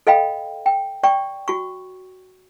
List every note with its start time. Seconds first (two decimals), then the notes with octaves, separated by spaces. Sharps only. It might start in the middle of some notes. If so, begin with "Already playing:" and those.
0.07 A4 D#5 F5 G5 B5
0.66 G5
1.03 D5 G5 C#6
1.48 F#4 C#6